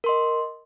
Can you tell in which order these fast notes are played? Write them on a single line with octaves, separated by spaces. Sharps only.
A#4 C6 D#5